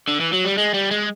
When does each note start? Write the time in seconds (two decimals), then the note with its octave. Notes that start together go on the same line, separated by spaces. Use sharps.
0.08 D3
0.20 E3
0.33 F#3
0.45 G3
0.57 G#3
0.74 G3
0.91 G#3